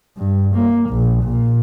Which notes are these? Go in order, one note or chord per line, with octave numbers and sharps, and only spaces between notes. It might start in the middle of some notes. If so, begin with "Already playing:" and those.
G2
A#3
A#1
A#2